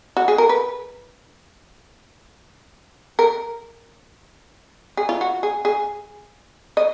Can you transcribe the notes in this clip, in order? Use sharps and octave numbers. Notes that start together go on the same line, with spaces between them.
F#4
G#4
A#4
B4
A#4
G#4
F4
F#4
G#4
G#4
D#5